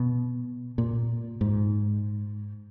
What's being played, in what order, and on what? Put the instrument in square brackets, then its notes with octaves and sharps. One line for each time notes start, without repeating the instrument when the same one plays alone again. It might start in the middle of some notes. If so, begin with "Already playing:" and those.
Already playing: [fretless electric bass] B2
A#2
G#2